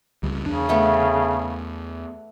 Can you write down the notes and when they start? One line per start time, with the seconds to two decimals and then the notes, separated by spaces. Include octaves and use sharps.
0.23 C#2 G3
0.46 E2 C#3 D4
0.69 A3 B3